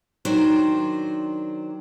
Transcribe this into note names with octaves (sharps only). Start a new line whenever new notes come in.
D#3 F#3 D4 C5